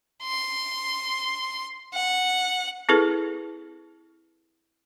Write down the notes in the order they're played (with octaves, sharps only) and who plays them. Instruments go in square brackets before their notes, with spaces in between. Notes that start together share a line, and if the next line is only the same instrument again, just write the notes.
[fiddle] C6
F#5
[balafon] C4 E4 G#4 A4 B4